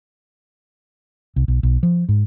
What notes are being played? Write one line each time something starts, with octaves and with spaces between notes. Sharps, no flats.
C2
B1
B1
F3
G#2